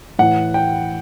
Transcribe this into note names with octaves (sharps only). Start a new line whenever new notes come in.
A2 E3 F#5
G5